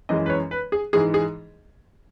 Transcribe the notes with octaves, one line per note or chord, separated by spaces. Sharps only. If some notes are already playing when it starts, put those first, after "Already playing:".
F#2 E3 G#3 D#5
B4
C#5
B4
G#4
G#2 E3 G#3 G#4
G#4